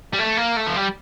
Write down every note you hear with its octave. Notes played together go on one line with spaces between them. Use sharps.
G3
A3
A#3
A3
F3
G3